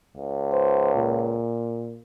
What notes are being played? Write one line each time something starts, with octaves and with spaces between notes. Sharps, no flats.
C#2
C5
A#2